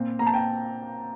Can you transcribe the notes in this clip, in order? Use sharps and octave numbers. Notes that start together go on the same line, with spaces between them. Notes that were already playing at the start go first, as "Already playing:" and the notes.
Already playing: A#2 C4
A#2 A#5
A5
G5